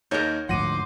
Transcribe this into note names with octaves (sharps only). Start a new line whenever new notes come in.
D#2 D#4 A#4 C#5 G6
D2 G#2 F3 F#5 C6 D6 A#6 D#7